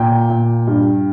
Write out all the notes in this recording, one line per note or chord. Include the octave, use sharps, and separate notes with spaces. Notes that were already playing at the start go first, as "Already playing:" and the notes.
Already playing: A#2 G5
A#2
G2